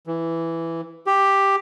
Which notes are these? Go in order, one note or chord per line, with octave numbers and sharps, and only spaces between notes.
E3
G4